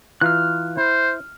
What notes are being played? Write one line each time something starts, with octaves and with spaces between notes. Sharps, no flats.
E3 F4 A#5 F6 F#6
E4 C5